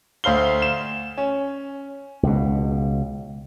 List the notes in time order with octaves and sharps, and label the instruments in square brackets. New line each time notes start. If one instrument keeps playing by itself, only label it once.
[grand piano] D2 C5 F5 G7
E7
C#4
[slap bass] C#2 B2